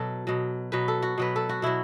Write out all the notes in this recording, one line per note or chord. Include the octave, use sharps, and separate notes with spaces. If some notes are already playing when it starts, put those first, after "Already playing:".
Already playing: B2 F#3 A4
B2 F#3
B2 F#3 B4
A4
F#4
B2 F#3 B4
A4
F#4
B2 F#3 E4